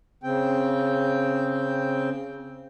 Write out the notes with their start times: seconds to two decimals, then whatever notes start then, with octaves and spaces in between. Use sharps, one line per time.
0.23 C#3 C4 G5